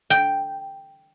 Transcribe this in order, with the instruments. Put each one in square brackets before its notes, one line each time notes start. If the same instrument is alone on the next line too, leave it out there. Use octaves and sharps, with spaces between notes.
[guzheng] G5